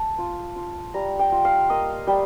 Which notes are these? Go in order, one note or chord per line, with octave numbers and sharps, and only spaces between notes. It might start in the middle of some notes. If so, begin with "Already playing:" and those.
Already playing: A5
F4
F4
G3 A#5
G5
F4
F5
A#3 D#5
G3 G5